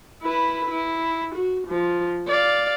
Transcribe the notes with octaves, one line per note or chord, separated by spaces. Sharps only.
E4 B4
E4
F#4
F3
D5 F5